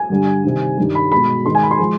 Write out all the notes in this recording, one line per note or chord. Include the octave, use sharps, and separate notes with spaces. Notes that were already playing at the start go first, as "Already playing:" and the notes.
Already playing: G#5
G2 D3 G3
C3 D#3 G3
G2 D#3 G3
B5
B2 G#3 B5
G#2 D#3 G#3 C6
G#5
B5
C6
F3 G#3